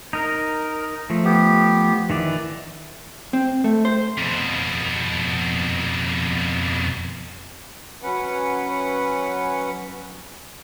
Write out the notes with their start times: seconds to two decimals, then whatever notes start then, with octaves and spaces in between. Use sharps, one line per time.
0.13 D#4 A#4
1.10 F3 A3
1.24 B3 G4
2.10 D#3 E3 D5
3.33 C4
3.64 A3
3.85 C5
4.18 F2 B2
8.03 F#3 C#4 B4 F#5